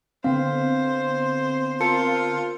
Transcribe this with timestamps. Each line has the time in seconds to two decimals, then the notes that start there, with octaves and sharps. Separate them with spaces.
0.24 D3 B3 C4 C5 F5
1.81 F4 A#4 A5 C#7